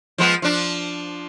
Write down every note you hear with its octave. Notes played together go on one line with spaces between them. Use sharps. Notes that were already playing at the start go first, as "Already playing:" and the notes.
F3 G#3 B3
F3 D4